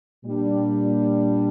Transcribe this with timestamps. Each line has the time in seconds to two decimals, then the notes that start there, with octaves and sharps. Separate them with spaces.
0.24 A#2 G3 D4